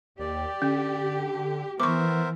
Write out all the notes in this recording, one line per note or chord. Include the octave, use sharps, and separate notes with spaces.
D#2 G4 D5
D3 C#4
E3 B3 A#4 C5 E5 C#6 D6